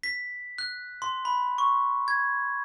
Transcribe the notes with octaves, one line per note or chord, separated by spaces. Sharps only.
B6
F#6
C6
B5
C#6
G#6